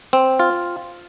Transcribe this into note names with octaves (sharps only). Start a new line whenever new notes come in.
C4
F4